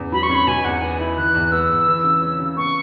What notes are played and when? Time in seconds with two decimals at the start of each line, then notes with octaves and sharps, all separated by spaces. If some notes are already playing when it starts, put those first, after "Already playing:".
Already playing: E2 C#3
0.12 F#3 B5
0.23 C#6
0.30 C#4 B5
0.47 B2 G#5
0.64 E2 F#5
0.81 B3 G#5
0.99 E4 B5
1.17 E3 F#6
1.34 E2
1.52 B3 E6
1.69 E2
1.87 E3
2.04 C#3
2.22 C#4
2.40 C#3
2.57 B3 C#6